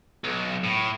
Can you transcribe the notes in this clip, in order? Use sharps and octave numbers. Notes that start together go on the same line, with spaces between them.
B1
A2